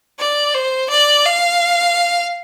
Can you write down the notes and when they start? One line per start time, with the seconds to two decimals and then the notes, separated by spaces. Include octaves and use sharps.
0.20 D5
0.54 C5
0.90 D5
1.26 F5